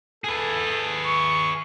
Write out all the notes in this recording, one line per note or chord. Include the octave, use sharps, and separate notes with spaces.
G#4 A4 B4
C#6